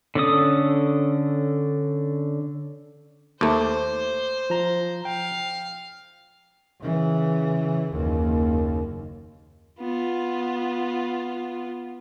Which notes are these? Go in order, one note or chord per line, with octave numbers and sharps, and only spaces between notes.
D3 C#4 A4 D#6
D#2 A3 C5 D6
F3 A#5
F5 G5
C#3 E3
F#1 D#2
B3 F4